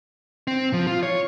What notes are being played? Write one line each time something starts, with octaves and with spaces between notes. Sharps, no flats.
C4
F3
F4
C#5